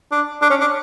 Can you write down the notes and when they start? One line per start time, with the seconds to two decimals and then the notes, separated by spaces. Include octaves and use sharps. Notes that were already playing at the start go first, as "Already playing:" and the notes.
0.11 D4
0.42 D4
0.50 C#4
0.60 D4